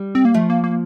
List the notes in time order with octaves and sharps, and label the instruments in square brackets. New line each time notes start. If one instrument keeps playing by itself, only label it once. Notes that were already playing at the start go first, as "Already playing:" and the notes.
Already playing: [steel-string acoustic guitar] G3
[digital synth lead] C4
A#3
[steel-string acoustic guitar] F3 [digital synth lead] A3
[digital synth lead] A#3
A#3